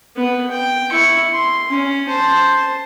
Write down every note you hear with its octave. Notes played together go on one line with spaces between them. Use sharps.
B3 B4
G5
E4 C#6
C6
C#4
C5 A5